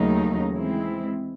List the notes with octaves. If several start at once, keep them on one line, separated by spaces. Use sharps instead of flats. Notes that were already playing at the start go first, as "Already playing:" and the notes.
Already playing: D#2 C#3 F#3 A3 D#4
E3 G#3 C4 E4